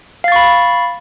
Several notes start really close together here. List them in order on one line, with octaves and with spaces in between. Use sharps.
F5 A6 C#6 B5